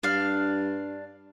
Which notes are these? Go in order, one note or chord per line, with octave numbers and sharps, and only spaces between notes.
G2 D4 F5